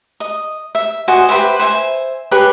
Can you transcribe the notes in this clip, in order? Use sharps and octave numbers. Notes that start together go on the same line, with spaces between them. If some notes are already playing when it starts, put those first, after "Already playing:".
D#5
E5
F#4 C5 D#5 G#5
G4 B4 C5 E5
C5 E5 G5 G#5
G4 G#4 B4 C#5